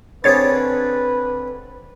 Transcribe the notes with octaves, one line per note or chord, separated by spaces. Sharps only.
D3 C4 D4 G#4 B4 C#5 A6